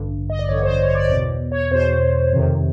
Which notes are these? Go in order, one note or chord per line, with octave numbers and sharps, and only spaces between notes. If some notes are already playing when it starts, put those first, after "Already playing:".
Already playing: A1 G2 D3
D#5
D5
A1 G2 D3 C#5
C5
C#5
D5
E2 B2 D5
C#5
E2 B2 C5
F2 C3 D#3